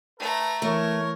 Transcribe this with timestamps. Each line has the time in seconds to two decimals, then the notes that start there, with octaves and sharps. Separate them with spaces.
0.19 A3 A4 B4 A#5
0.62 E3 A3 A#4 C#5